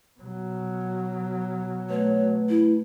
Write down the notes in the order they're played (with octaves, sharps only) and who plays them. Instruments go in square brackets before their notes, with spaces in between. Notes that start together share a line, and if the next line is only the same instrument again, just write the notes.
[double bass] B2 F#3
[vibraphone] A3 B4 [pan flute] C#5
[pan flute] E4